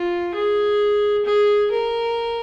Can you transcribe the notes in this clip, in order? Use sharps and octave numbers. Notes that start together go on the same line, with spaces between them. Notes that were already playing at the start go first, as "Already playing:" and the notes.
Already playing: F4
G#4
G#4
A#4